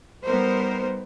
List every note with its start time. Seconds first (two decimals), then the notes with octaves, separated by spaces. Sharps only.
0.23 G3 B3 D#4 A#4 C5